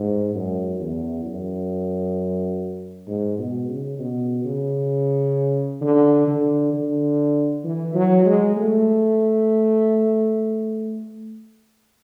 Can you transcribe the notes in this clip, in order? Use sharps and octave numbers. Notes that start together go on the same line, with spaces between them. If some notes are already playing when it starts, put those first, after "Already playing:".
Already playing: G#2
F#2
E2
F#2
G#2
B2
C#3
B2
C#3
D3
D3
D3
E3
F#3
G#3
A3